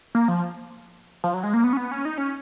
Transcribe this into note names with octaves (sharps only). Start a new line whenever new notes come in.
A#3
F3
F3
F#3
G#3
A#3
B3
C#4
B3
C#4
D#4
C#4